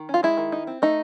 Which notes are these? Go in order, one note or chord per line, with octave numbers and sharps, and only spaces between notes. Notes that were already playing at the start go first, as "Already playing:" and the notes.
Already playing: D#3
C#4
F4
G#3 E4
D#3
D#4
C4
A3 D#4